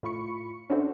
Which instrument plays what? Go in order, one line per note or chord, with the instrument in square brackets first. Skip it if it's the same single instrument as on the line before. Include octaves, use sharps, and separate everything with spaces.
[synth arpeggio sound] A2 F4 B5 C#6 C#7
C#4 D4 E4 F#4 A4 C5